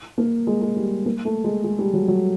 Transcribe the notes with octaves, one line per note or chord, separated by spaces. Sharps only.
A#3
G#3
G#3
G3
A#3
A3
G#3
G#3
G3
F#3
F#3